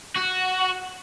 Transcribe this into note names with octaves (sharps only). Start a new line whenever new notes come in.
F#4